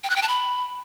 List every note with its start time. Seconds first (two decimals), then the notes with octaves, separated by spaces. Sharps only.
0.04 G5
0.10 F#6
0.16 G5
0.22 A5
0.28 B5